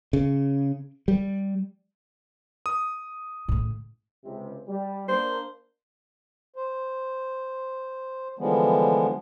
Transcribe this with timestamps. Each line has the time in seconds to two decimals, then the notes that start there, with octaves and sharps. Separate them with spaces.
0.13 C#3
1.08 G3
2.66 D#6
3.48 A2 C#3
4.25 C#2 C3
4.68 G3
5.08 A#3 D4 C5
6.56 C5
8.39 D3 E3 F3 G3 G#3 B3